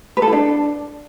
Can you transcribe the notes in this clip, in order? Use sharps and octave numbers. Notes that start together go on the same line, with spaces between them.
B4
A4
E4
D4